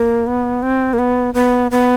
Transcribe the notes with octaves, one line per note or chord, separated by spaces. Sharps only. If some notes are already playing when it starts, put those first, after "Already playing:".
Already playing: A#3
B3
C4
A#3
B3
B3
B3